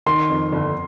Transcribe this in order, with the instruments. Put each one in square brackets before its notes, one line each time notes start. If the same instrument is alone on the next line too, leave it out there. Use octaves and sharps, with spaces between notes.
[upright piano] D#3 [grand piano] C6
[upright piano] F2
G1